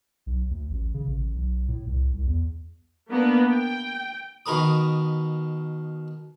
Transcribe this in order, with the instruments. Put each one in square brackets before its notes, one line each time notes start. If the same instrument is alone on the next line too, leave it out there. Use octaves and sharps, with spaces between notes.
[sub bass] B1
D2
A1
C#3
A1
B1
A2
C2
C2
E2
[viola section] A#3 B3 D4
G5
[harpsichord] B2 D#3 A#4 B4 D#6